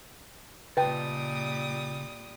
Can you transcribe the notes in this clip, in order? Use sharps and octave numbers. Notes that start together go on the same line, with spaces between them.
A#2 C#3 G3 F4 B4 G5 A5 D#6